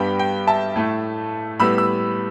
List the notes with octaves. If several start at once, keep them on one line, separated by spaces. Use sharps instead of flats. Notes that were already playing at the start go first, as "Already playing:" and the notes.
Already playing: G2 G3 B3 G5 B5
G5
E5 A5
A2 A3
A2 G3 B3 B5 E6
E6